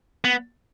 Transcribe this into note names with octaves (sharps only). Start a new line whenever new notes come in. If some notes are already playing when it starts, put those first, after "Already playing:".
B3